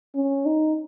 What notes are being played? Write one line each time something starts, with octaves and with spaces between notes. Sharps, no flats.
C#4
D#4